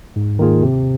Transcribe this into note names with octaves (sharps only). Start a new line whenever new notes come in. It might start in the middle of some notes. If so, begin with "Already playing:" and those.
G#2
D#3 A#3 F4 G#4
C3